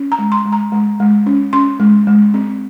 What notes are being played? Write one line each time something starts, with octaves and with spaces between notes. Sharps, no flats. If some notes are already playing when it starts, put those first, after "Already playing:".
Already playing: C#4
A#5
G#3
C6
G#3
A#5
G#3
G#3
C#4
C#4 C6
G#3
G#3
C4